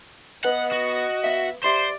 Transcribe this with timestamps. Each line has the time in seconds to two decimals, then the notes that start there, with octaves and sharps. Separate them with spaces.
0.45 B3 B4 D#5 F#5
0.72 F#4
1.24 B3 E5 F5
1.64 G4 C5 D5 E5 C6